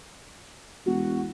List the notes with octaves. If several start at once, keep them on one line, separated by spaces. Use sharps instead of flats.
E1 F#4